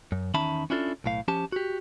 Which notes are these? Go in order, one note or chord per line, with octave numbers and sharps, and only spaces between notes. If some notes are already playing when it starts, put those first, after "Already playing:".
F#2
E2 D#3 C#4 E5 A5 B5
C#4 D4 E4 F4 G4 A4
B1 A2 F5
F3 C#4 G4 A5
F#4 G4